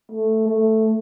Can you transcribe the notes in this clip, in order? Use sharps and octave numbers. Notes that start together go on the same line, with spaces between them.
A3
A3